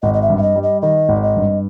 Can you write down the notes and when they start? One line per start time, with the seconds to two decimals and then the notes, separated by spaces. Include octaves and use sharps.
0.03 G#1 D#5
0.14 D#5
0.22 E5
0.30 G2
0.38 E5
0.43 D#5
0.56 G3
0.63 D#5
0.82 D#3 D#5
1.09 G#1
1.23 D#5
1.37 G2